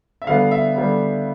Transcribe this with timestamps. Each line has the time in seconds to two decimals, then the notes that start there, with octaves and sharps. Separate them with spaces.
0.22 E5
0.27 D3 G3 B3 F5
0.51 E5
0.76 D3 G3 B3